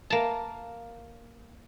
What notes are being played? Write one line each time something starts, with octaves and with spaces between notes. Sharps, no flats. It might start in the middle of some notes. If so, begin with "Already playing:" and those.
A#3 A5